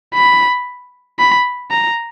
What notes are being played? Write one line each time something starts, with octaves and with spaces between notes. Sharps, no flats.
B5
B5
A#5